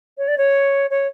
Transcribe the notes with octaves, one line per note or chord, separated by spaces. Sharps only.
C#5
D5
C#5
C#5